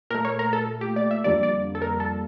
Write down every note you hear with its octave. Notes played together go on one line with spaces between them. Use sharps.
A#2 A3 A#4
C#5
A#4
A4
G4
D5
E5
F2 D3 G3 A#3 D5
D5
A4
A#4
A4